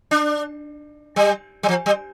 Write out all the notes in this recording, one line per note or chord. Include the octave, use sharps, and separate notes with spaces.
D4
G3
G3
F3
G3